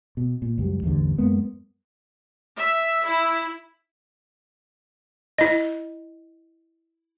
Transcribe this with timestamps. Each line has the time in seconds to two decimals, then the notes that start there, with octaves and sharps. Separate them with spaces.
0.17 B2
0.42 A#2
0.58 C#2 F#2 G3
0.84 A1 E2 G2 D3
1.18 F#2 G#3 A#3 B3
2.57 E5
3.04 E4
5.38 E4 D#5